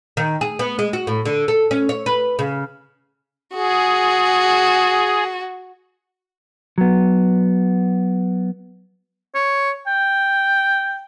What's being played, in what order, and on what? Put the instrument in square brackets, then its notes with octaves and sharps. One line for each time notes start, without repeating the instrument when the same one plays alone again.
[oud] D#3
G#4
B3
G#3
F#4
A2
D3
A4
C#4
C#5
B4
C#3
[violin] F#4 [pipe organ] G#4
[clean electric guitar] F#3 B3
[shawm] C#5
G5